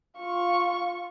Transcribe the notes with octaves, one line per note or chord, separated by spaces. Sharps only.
F4 C#6